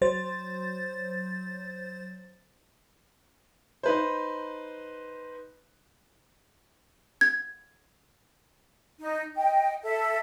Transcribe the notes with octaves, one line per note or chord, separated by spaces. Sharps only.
F#3 C5 A6
D#4 B4 C5
G#6
D#4
D#5 G5
A4 E5